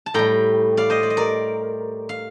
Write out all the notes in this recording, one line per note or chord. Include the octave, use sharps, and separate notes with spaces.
A5
A2 G3 G5 A#5
D5 F5
C5 D#5
D5
D#5
A#4 D5
F5